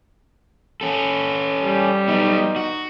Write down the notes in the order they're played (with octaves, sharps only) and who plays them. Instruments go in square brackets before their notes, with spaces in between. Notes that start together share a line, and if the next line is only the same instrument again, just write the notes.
[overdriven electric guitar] C#4 A4
[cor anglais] G3
[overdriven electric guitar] F#3 B3 [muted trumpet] D#4
[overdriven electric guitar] F#4